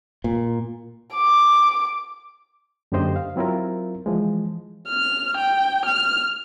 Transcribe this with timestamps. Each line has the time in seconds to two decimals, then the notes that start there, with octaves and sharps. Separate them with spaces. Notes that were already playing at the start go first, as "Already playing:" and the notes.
0.24 A#2
1.15 D6
2.92 F#2 D3 A#3 G4 C5 D#5
3.16 F5
3.36 F#3 C4 E4 F4 A#4
4.06 E3 F3 G#3
4.87 F6
5.37 G5
5.86 F6